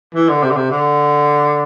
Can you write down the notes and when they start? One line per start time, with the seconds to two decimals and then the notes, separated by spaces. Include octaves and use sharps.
0.14 E3
0.29 D3
0.42 C3
0.50 D3
0.56 C3
0.70 D3